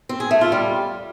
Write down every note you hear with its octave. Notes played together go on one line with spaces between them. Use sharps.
C4
G#4
A3
F4
G3